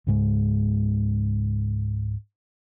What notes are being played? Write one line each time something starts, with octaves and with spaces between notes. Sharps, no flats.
C#2 G#2 G#3